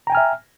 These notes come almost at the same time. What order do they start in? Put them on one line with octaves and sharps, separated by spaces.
A#5 G5 G#5 F6 E5